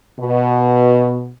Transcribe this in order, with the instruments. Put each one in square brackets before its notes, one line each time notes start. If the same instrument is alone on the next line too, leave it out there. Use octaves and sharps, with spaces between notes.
[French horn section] B2